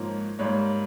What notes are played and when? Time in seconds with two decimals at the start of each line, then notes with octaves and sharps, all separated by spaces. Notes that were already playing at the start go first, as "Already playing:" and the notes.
Already playing: G#2 F3 A#3 C#5
0.39 G#2 G3 A#3 C#5